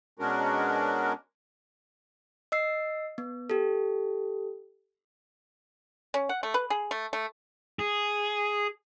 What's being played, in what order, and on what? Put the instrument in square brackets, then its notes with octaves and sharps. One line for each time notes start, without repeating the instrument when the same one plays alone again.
[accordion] B2 G#3 C#4 D4 F#4 A#4
[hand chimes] D#5 E6 C7
B3
G4 A4
[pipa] C#4
F#5
A3
B4
G#4
A3
A3
[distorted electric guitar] G#4